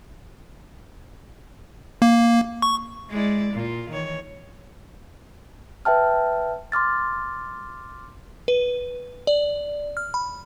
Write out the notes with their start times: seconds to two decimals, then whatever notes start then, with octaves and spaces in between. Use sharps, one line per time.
2.02 A#3
2.62 C#6
3.10 G#3 E4 D5
3.53 A#2 F4
3.89 D#3 E3 C#5
5.85 B4 E5 G5 A5 F6
6.72 C6 D6 F6 A6
8.48 B4
9.27 D5
9.97 F6
10.14 B5